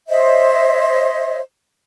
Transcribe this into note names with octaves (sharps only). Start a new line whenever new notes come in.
C5 C#5 D#5 E5